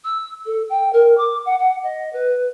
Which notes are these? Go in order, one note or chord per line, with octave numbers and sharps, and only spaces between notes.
E6
A4
G5
A#4
D6
F#5
F#5
D#5
B4